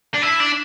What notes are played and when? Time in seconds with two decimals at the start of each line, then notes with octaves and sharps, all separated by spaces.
0.14 D4
0.22 E4
0.40 D4